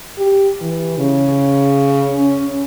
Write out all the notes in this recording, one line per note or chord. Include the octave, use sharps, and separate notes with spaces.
G4
E3
C#3
C#4